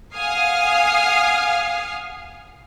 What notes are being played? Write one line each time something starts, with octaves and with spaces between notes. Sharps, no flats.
F5 F#5 G#5 D#6 F6 C7